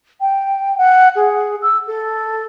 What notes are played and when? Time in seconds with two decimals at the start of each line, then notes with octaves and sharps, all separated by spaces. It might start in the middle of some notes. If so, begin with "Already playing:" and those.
0.21 G5
0.78 F#5
1.16 G#4
1.62 E6
1.87 A4